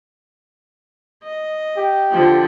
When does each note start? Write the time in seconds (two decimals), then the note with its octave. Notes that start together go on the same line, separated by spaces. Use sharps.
1.23 D#5
1.77 G4
2.12 D3 F3